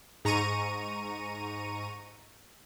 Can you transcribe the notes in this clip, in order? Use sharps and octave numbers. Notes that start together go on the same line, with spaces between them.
G#2 A#5 C#6 D#7